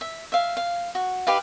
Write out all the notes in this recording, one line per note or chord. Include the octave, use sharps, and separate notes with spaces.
E5
E5 F5
F5
F#4
D#4 G4 B4 F5